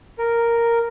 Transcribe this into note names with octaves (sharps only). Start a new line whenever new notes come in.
A#4